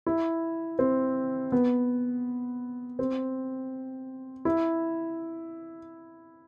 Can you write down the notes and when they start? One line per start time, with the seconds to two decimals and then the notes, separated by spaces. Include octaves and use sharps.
0.07 E4
0.79 C4
1.52 B3
2.99 C4
4.45 E4